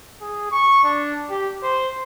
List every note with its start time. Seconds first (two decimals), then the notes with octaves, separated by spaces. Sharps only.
0.21 G#4
0.52 C#6
0.84 D4
1.30 G4
1.63 C5